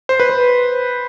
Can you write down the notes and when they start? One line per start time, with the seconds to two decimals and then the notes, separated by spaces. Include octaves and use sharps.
0.09 C5
0.20 B4
0.30 C5